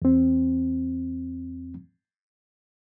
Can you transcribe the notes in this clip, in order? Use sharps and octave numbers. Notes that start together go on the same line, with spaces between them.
E2 C4